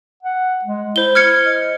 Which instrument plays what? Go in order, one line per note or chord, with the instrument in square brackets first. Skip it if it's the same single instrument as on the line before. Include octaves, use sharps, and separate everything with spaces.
[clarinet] F#5
G#3
[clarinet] E4 [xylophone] C5 G7
[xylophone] F6 G#6 C#7
[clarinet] D#5